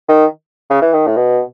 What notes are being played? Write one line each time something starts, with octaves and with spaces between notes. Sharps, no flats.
D#3
C#3
E3
D#3
A2
B2